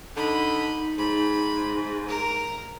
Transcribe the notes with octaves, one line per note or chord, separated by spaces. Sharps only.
D3 D#4 D#5 B5
G#2 B5
A#4 A#5